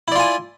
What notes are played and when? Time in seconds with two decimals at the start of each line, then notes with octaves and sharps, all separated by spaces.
0.08 E4
0.12 D5
0.16 F4
0.20 G#5